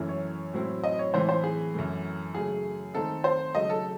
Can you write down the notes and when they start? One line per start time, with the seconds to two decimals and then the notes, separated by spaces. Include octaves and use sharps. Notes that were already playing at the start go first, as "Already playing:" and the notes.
Already playing: F#2 E3 A3 C#4 E4
0.09 C#5
0.53 A2 F#3 C4 E4
0.84 D#5
0.99 C#5
1.14 A2 E3 C4 C5
1.29 C5
1.44 G#4
1.74 F#2 E3 A3
2.34 C#3 F#3 A3 G#4
2.94 D#3 A3 C4 D#4 A4
3.24 C5
3.54 C#3 F#3 A3 D#5
3.70 A4